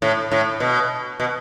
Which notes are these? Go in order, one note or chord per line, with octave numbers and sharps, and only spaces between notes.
A2
A2
B2
B2